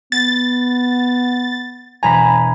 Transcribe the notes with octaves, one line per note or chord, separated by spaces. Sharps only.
B3 A6
E1 G#5 A#5 B5